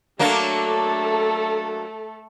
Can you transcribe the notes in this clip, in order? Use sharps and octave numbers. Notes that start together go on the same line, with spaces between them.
F#3 A3 A#3 D4 A4